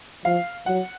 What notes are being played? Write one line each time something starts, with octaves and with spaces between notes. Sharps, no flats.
F3 F5
F#3 F#5